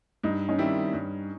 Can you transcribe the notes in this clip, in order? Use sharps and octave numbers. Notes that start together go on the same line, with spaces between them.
G2 D#4
C#4 D#4
D#3 G3 C4 E4
G2